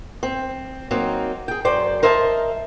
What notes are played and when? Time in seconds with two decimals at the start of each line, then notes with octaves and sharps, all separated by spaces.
0.23 C4
0.91 F#3 A#3 C4 D#4
1.48 G#4 G5
1.65 F#2 C5 D5 G5
2.03 A#4 C5 D#5 E5 G#5 A5